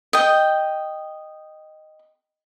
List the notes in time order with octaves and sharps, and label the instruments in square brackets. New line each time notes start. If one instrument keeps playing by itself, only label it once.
[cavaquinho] D#5 G5